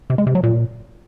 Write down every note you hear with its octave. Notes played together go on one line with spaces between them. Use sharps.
C3
G#3
C3
F#3
A#2